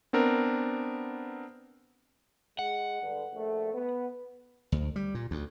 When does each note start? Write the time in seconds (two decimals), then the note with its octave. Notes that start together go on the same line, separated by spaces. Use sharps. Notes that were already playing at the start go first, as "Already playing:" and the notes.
0.13 B3 C4 D4 A#4
2.59 G#3 F#5
3.02 G2 D3
3.34 A#1 A3
3.74 B3
4.72 D2
4.96 G3
5.15 A#2
5.31 D2